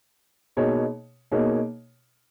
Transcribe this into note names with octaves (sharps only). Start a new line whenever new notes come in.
B2 A#3 D#4 G#4 C#5
B2 A#3 D#4 G#4 C#5